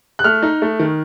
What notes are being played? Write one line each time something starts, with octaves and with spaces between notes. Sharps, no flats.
F#6
A3 F6
D#4
A3
D#3